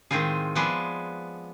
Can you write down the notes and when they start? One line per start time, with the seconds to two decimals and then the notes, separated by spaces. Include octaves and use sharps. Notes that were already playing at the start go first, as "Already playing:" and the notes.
0.11 A2 D#3 G#3 C4 F4 G#4
0.55 F3 G#3 B3 G#4 D5 E5